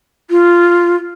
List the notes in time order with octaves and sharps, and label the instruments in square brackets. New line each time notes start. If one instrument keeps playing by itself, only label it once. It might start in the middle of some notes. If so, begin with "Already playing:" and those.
[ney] F4